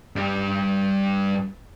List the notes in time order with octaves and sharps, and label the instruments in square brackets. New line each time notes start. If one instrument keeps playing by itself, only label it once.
[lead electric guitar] G2 G3